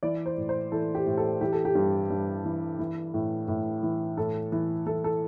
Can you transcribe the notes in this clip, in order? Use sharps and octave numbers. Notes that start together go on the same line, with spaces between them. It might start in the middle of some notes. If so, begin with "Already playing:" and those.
E3 D5
C5
A2
C5
E3 A4
G4
A2
A4
E3 G4
A4
G4
G2
G2
E3
E3
A2
A2
E3
A2 A4
E3
E3 A4
A4